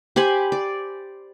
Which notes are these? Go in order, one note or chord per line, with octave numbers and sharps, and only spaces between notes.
G4 C5 G#5 B5
D5